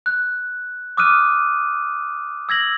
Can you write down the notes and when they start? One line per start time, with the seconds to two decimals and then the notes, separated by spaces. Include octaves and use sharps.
0.06 F#6
0.97 D6 D#6 F6 F#6 D#7
2.49 E6 G#6 A#6 F#7